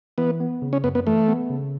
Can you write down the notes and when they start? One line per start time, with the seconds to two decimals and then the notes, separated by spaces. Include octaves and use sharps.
0.18 E3 B3
0.40 B3
0.62 C#3
0.73 C#4
0.84 F#2 B3
0.95 B3
1.06 E3 A3
1.28 B3
1.50 C#3